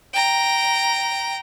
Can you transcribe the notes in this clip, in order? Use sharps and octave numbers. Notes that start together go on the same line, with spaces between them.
G5 A#5